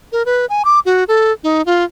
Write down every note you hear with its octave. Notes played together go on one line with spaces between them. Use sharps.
A#4
B4
G#5
D6
F#4
A4
D#4
F4